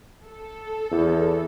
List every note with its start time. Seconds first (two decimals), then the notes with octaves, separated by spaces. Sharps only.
0.24 A4
0.91 E2